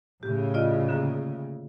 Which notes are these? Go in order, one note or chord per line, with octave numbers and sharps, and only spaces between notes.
A2 C#3 G4
F4 D5 D#5
D3 A#3